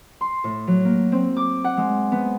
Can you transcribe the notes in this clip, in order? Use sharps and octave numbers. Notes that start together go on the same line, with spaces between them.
C6
A2
F#3
A#3
C4
D6
F#5
G#3
B3